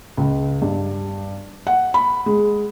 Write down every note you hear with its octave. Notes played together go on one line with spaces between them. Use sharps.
C#2
G2
F#5
B5
G#3